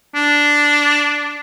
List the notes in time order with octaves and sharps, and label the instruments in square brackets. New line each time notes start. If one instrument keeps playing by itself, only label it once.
[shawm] D4